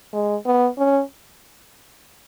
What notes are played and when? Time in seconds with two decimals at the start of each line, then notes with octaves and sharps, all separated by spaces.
0.13 G#3
0.46 B3
0.78 C#4